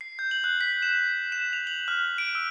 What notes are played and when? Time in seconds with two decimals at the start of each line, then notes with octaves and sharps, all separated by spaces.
0.01 C7
0.19 G6
0.31 F#7
0.44 F#6
0.61 B6
0.83 E7
1.32 E7
1.53 F7
1.67 F#7
1.88 F6
2.18 D7
2.35 E6